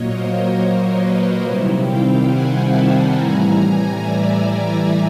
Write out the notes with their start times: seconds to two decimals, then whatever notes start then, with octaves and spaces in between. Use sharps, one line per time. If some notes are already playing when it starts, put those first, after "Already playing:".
Already playing: A#2 F#3 A#3 C#5 D#5
0.12 A#4 C5
0.99 B4 C#5
1.43 C3 D#3 G3 C4 E4
1.85 F5 G5
2.29 F#5 G#5
2.72 A5 B5
3.15 A2 E3 G3 G#5 A#5
3.58 G#5 A#5
4.02 D5 E5
4.45 D5 E5